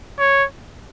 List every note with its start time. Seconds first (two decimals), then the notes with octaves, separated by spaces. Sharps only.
0.19 C#5